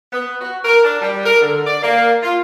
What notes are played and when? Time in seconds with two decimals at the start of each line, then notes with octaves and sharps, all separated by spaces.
0.13 B3
0.41 F#4
0.64 A#4
0.84 D4
1.02 G3
1.25 A#4
1.41 D3
1.67 D5
1.83 A#3
2.22 F4